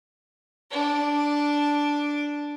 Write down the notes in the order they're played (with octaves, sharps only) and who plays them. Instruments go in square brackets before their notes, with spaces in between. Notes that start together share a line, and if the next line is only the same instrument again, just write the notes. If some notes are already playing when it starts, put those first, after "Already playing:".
[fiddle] D4 D6